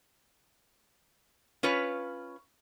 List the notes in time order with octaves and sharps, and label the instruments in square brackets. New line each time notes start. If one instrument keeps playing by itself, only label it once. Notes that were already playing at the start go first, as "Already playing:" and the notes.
[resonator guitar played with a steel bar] C#4 F4 B4 C#5